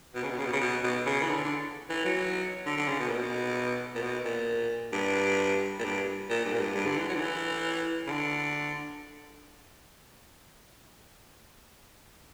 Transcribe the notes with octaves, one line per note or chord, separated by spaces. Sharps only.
B2
C#3
B2
C#3
B2
C#3
B2
B2
C#3
E3
D3
D3
E3
F#3
D3
D3
C#3
B2
A#2
B2
A#2
B2
A#2
G2
A#2
G2
A#2
G2
A#2
G2
G2
D3
E3
F#3
D3
E3
C#3
D3